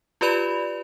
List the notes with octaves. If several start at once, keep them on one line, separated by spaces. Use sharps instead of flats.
F4 G4 B4 D5 B5 F7